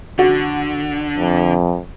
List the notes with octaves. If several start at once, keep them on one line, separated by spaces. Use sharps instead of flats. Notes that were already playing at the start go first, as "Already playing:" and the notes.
D3 F#4
F2